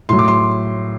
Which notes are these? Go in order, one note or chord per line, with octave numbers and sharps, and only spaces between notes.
A2 F#3 C6
D6
C6